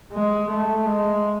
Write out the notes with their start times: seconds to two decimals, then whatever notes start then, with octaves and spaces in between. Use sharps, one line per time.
0.13 G#3
0.50 A3
0.86 G#3